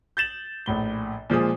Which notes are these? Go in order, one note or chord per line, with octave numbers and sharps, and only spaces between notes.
G6 A6 E7 F#7
A#1 A2 G7
A#2 F3 G#3 D#6